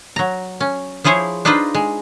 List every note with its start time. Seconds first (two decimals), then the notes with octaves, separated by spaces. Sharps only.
0.16 F#3 A#5
0.60 C#4
1.04 F3 E4 G#4 C5 C#5
1.45 D4 D#4 F4 B4 C5
1.75 G#3